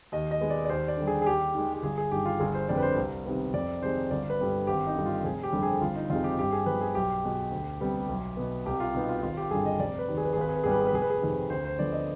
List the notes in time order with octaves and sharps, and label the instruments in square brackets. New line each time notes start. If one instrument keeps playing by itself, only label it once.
[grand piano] D#2 D#5
D#5
D#3 G#3 B3
D5
D5
D#2 C5
D5
D3 G3
G#4
G#4
D#2 G4
D#3 G#3
G4
G1 G#4
G#4
G2 D#3 G4
F4
G1 G#4
C5
F2 D3 G3 D5
B4
C5
C2
C3 D#3 B3
F2 D5
C3 D#3 G#3 C5
G1 D5
B4
G2 D3 G3 B3
G#1 G4
D#4
G2 D3
F4
F1 G#4
G4
F2 D3 G3
G#4
G1 F4
D#4
F2 C3 D#3 G#3 F4
G4
G2 G4
G#4
F3 B3 B4
G#4
B1 G4
B2 G#3
D2
C3 G3 B3
B1
B2 B3
C2 G4
F4
B2 B3 D#4
F4
G#1 F4
G4
G2 D3 G3 G#4
D#5
F1 D5
B4
D#2 D#3
G#4
B4
G#4
G#1 B4
G#4
B4
G#2 G3 B3 G#4
B4
G#4
B4
F1 G#4
B4
G#4
F2 C3 D#3
D2 C5
C5
D3 F3 B3 D5
D#5